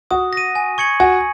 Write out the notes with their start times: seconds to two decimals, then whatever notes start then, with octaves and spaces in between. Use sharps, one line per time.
0.11 F#4 D#6
0.33 A#6 D#7
0.55 G#5
0.78 C#6 G#6 C#7 F#7
1.00 F#4 G#5